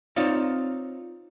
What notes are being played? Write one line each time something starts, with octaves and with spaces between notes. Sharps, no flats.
C4 D#4 F4 C#5 D5 F5